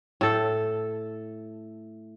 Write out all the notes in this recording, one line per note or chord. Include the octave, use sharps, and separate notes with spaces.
A2 A4